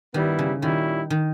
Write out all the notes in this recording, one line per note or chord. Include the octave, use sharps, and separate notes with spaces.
G2 D#3 G3 B3 E4
C#3
A#2 D#3 G3 C#4 E4
D#3